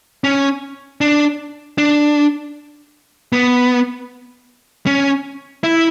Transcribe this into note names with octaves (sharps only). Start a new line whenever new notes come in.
C#4
D4
D4
B3
C#4
E4